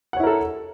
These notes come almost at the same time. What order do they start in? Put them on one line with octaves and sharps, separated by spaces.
F#5 C#5 E4 A#4 A4